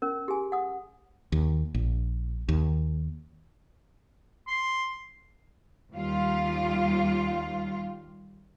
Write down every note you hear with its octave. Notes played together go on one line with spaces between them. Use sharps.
C#4 A#4
G4 G#4 G#5
F#5 D#6
D#2
A#1
D#2
C6
D#2 G3 F4 F5